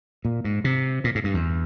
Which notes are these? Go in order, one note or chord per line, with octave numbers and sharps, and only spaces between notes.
A#2
G#2
C3
A#2
G#2
G2
E2